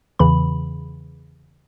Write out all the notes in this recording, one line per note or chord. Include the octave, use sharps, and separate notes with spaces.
E2 C#3 E3 B5